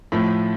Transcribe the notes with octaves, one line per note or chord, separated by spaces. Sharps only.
A2 F3 A3